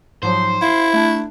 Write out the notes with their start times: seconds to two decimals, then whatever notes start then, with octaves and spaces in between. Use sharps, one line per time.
0.23 G#2 F3 F#3 C5
0.61 E4 F5
0.93 A3 D4